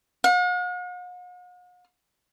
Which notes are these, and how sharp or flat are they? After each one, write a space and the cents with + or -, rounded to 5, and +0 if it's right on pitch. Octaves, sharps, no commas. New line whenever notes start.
F#5 -45